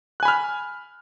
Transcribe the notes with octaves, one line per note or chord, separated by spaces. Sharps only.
G#5 B5 F6 F#6